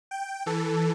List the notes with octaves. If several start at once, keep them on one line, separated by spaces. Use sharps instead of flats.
G5
E3 A4